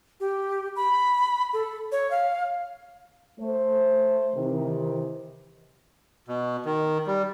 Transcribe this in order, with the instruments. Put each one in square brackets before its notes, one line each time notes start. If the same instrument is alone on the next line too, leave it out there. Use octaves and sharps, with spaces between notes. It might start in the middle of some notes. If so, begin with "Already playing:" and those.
[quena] G4
B5
A4
C#5
F5
[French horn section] A3 C5
C3 D#3 E3
[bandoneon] B2
D#3
G3